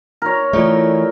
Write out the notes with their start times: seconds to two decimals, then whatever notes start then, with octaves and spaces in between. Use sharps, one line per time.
0.22 A#4 C#5
0.53 E3 A3 F4 A4 D5